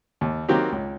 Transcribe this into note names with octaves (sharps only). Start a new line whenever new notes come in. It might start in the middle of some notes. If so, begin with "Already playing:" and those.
D#2
D#3 F#3 A#3 C4 F#4 G4
C#2